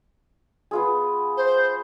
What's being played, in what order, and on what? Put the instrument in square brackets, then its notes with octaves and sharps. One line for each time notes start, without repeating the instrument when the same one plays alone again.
[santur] B3 F4 G#4
[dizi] C5